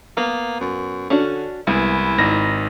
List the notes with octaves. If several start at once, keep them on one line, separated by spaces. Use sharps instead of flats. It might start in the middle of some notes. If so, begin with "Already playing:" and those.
A#3 B3
F#2
D3 C#4 D4 F#4
C2 G#3 B3 E4 B4
G#1 D#4 A#6